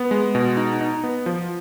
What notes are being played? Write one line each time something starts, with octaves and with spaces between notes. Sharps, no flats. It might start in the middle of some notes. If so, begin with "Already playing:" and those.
Already playing: B3
G#3
B2
D#4
D#4
B3
F3